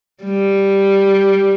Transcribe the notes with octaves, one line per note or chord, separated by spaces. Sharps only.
G3